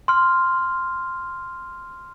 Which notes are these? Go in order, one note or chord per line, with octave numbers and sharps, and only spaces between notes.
C6 F6